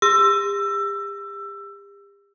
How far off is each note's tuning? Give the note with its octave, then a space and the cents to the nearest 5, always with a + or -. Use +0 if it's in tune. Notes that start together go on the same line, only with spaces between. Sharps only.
G4 +40 E6 +20